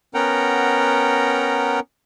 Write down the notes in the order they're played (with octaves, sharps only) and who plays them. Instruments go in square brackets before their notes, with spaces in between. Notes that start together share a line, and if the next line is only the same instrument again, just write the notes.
[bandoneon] B3 C#4 A#4 F#5 G5 A#5